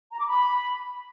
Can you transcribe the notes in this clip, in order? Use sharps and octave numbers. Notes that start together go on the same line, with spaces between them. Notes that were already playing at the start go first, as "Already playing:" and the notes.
A#5
D6
B5